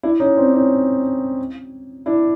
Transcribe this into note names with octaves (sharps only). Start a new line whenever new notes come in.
D4 E4
C#4 D#4
C4 D4
C#4 D#4
D4 E4